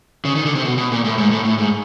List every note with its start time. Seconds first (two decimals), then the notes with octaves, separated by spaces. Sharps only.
0.25 C#3
0.35 D#3
0.45 D3
0.55 C3
0.65 B2
0.78 B2
0.92 A#2
1.05 A2
1.18 G#2
1.31 A2
1.45 A2
1.58 G#2